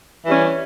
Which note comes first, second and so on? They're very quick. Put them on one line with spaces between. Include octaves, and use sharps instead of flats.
E3 G3 C#4